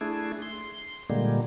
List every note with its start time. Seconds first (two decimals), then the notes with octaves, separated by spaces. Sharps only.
0.01 A3 D4 E4 G#4
0.42 C6
1.10 A#2 D3 G3 G#3 A#3